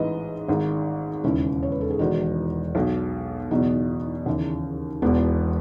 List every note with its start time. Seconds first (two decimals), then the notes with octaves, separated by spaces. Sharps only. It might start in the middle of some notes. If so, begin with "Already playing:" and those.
Already playing: A1 G#2 E3 B4 D#5
0.48 G#1 G#2 D#3
1.24 E1 D#2 C#3 C#4 E4
1.63 C#5
1.72 B4
1.81 A4
1.90 G#4
1.99 E1 E2 D#3 D#4 F#4
2.75 B1 B2
3.51 F#1 E2 B2 B3 D#4
4.26 D#2 C#3 E3
5.02 E1 E2 B2 B3